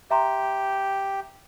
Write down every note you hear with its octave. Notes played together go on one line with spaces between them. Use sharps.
G4 E5 A#5 C6